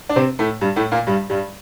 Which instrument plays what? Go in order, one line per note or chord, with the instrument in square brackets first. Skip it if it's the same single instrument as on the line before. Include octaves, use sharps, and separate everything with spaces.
[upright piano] D4
C3 C4
A2 A3
G2 G3
A2 A3
A#2 A#3
G2 G3
G2 G3